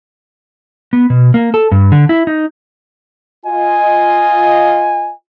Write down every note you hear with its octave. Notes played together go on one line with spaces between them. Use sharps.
B3
B2
A#3
A4
G2
D3
E4
D#4
F4 D#5 G#5